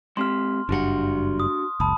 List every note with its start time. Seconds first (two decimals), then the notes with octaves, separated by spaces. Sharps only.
0.17 G#3 C4 G4 C6 F6
0.69 F#1 G2 D4 F#4 F#5
1.40 D#6
1.80 F#1 C#2 A5 B5 D#6